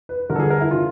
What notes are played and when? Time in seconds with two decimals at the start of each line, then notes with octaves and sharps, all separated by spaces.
0.09 B4
0.29 G2 D3 G3 A#4
0.36 A4
0.39 G#4
0.50 A#4
0.60 E4
0.70 C#3 E3 F4